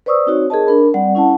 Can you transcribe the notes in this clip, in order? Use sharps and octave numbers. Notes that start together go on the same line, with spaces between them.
B4 C5 D5 C#6 D#6 E6
C4 D#4 F#4 C#5
G#4 A#4 D#5 A5
D4 A#4 B5
G3 C4 D5 F#5
C#4 E4 F#5 A5